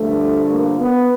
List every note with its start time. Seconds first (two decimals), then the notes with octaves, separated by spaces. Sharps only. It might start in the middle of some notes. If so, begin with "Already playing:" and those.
Already playing: G2 D3 F3 A3
0.50 A#3
0.80 B3